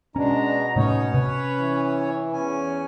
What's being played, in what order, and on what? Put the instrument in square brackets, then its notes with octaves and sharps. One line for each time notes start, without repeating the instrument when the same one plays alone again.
[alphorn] B2 [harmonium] G#3 D4 [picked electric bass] C#4 [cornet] A#5
[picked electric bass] A2 C3 A3 [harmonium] C#4 C#5 [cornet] D#4
[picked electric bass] C3 [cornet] B4
[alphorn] E3
[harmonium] E2 G#5 [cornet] C#4